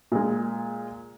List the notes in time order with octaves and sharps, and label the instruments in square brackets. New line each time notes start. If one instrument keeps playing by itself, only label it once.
[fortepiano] A#2 G#3